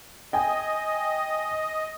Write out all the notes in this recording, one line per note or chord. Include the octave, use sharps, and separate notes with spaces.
D#5 G5 G#5